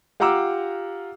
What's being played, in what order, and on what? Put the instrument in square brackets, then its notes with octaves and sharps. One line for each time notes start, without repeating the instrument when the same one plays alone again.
[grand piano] F4 G4 F#5 A#5 D6 E6